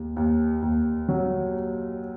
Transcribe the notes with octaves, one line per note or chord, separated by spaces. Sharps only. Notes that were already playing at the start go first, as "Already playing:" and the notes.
Already playing: D#2
D#2
D#2
F#3